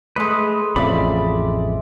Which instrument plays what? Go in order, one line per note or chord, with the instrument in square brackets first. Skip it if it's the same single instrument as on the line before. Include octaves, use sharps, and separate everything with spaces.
[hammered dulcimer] G#3 D#5 [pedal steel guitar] A3 B4
[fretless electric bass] A1 F2 C#3 [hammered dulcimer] D5 E5 [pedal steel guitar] B5